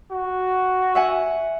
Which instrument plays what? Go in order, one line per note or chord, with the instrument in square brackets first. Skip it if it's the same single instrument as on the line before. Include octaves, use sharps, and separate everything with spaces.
[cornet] F#4
[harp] E5 F#5 G#5